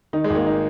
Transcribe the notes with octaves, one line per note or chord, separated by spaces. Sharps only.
D#3 D#4
G#3
G#1
A#3
D#4